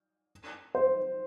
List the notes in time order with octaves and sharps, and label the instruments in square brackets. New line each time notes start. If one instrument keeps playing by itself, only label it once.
[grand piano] C5